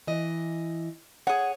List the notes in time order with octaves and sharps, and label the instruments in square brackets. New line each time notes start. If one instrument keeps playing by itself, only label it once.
[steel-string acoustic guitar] E3 D#5
[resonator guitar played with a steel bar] G#4 F#5 [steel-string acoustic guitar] C#5